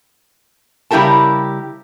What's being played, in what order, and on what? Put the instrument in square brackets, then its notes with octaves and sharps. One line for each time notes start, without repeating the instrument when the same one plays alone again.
[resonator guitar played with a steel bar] C#3 G3 E4 G4 A#4 A5